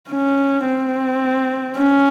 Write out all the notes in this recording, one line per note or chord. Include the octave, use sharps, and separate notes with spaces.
C#4
C4
C#4